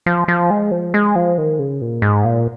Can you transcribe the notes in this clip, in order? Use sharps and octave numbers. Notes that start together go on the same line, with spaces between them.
F3
F3
G#3
F3
G#3
F3
D#3
C#3
A#2
G#2
A#2